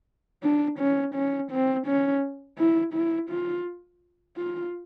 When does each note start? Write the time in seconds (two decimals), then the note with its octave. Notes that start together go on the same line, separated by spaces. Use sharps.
0.43 D4
0.79 C#4
1.15 C#4
1.52 C4
1.87 C#4
2.58 E4
2.94 E4
3.30 F4
4.37 F4